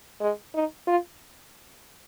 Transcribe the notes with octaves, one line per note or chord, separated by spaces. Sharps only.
G#3
D#4
F4